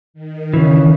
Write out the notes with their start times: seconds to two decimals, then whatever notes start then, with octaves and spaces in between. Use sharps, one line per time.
0.14 D#3
0.54 C#3 E3